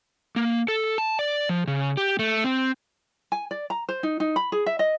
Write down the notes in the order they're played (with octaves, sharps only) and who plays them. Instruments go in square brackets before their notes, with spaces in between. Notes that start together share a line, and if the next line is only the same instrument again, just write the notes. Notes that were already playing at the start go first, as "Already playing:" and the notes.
[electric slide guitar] A#3
A4
A5
D5
F3
C#3
G4
A3
C4
[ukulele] G#5
D5
A#5
C5
D#4
D#4
B5
G#4
E5
D#5